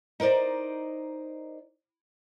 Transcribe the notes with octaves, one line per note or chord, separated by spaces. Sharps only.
D#4 A#4 C5 D5 D#5